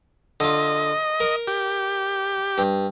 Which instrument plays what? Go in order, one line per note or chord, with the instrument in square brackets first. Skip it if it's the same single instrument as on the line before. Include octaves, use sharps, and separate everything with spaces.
[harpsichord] D3 F4 [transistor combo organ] D#5
[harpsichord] A#4
[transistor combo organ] G4
[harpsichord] G2